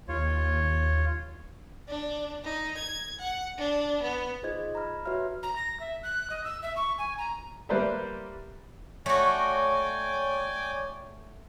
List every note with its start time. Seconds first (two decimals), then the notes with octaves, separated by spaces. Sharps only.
0.08 D#2 F4 C#5
1.87 D4
2.43 D#4
2.77 G#6
3.19 F#5
3.57 D4
4.01 B3
4.43 D#4 F4 G#4 C5 D#5 G#6
4.75 A#5 B5 F6
5.05 F#4 B4 C#5 E5 F6
5.43 A#5
5.56 A#6
5.80 E5
6.03 F#6
6.30 D#5
6.44 E6
6.62 E5
6.76 C#6
6.98 G#5
7.18 A#5
7.69 G3 A#3 B4 C5 D5 E5
9.06 A3 F#4 C#5 D5 G5 G#5 C#6